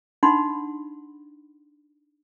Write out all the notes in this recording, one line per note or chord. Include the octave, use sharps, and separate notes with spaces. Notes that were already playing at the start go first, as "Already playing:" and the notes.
D4 D#4 F#5 B5 C6